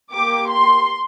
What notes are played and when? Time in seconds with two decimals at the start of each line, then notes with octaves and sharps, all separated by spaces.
0.12 A#3 G4 D6
0.50 C6